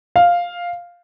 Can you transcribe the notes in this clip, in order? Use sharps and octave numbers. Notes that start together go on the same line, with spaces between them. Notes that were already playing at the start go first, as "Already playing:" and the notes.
F5